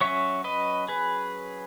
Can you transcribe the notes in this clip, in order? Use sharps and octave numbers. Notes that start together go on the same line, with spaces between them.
F#3 C#4 C#5 E5
B4 D#5
G#4 B4